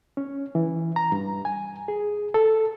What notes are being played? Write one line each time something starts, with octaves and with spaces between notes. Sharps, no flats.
C#4
E3
A#5
G2
G#5
G#4
A4